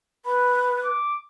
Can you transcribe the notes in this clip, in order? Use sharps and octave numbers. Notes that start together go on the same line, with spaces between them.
B4 B5
D6